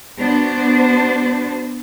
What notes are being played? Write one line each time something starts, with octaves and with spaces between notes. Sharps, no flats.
B3 D4 F#4 C5